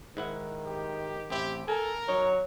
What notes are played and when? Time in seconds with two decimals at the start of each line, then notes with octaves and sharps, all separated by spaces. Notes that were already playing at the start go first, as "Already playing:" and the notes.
0.17 G#2 D#3 E4 F#5
0.66 G4
1.30 A1 C4 E4 G4
1.68 A4 A#4 G#5
2.08 F#3 D#4 C#5